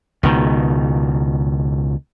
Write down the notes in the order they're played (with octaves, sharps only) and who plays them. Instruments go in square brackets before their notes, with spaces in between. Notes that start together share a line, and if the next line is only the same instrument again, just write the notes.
[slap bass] C#2 B2 D#3